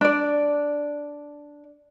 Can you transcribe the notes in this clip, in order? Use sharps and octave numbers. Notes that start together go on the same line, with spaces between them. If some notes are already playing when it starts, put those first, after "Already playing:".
D4 D5